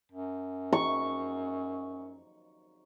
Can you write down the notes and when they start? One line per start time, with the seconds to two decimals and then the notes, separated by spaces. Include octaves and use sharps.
0.12 F#2
0.73 C#6